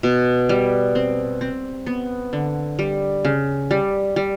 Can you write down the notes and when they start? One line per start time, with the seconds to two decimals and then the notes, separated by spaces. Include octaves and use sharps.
0.03 B2
0.49 G3
0.95 C4
1.41 C4
1.87 B3
2.33 D3
2.79 G3
3.25 C#3
3.71 G3
4.16 G3